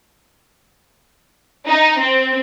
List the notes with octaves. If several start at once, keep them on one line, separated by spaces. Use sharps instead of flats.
D#4
C4